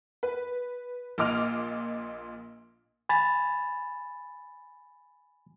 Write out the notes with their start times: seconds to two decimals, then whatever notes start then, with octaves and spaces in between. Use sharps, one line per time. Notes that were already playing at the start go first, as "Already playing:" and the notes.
0.23 B4
1.18 A#1 A#2 D#5 D6 F6 F7
3.09 G#5 B5 A6